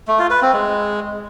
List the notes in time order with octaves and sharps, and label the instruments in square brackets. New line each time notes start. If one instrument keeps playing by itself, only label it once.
[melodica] A3
F4
B4
C4
G#3